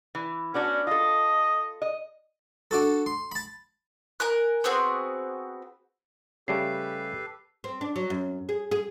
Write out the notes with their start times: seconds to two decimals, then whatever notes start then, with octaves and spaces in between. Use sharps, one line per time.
0.15 E3
0.54 B3 C#4 D4 F#4
0.87 F4 A4 D#5
1.82 D#5
2.71 D4 F#4 A4
3.06 C6
3.32 A5 B5
4.20 A#4 G#5 F#6
4.64 B3 C4 F#4 G#4
6.48 C#3 G3 A3 G4 A4 B4 C7
7.64 C4
7.81 D4
7.96 F#3
8.10 F#2
8.49 G#4
8.71 G#4